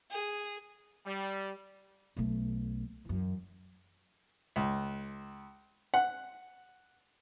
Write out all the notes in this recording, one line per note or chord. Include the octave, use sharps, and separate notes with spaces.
G#4
G3
B1 A3
F#2 E3
C#2
F#5